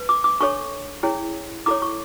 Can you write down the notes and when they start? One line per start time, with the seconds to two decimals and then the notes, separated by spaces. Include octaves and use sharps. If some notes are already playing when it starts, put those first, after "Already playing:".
Already playing: B4
0.09 D6
0.24 D6
0.40 D4 A4 C#5 C#6
1.03 C#4 E4 G#4 C#5
1.66 E4 A4 C#5 D6
1.82 C#6